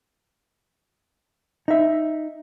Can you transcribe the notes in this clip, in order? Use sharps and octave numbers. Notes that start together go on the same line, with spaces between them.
D#4 E5